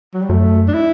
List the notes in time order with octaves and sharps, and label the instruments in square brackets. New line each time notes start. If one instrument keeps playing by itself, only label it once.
[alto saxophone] F#3
G3
[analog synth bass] F#2 [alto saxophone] A3
[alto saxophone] D4
E4